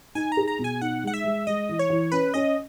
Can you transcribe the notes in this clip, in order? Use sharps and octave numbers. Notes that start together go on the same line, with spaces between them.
D#4 G#5
A#5
G#4
A#5
B2
G#5
D#4 F#5
G#3 F#5
E5
G#3
G#3 D#5
E3
C#5
E3
C#4 B4
C#4 D#5